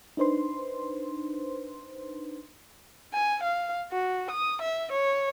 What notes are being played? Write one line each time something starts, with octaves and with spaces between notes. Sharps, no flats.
D4 D#4 B4 C5 C6
G#5
F5
F#4
D#6
E5
C#5